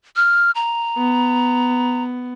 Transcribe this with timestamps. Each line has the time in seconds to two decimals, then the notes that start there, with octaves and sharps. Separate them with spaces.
0.16 F6
0.55 A#5
0.97 B3